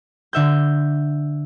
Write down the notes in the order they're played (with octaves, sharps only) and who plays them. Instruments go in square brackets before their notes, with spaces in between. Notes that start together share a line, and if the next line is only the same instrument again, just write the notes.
[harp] D3 E5 G6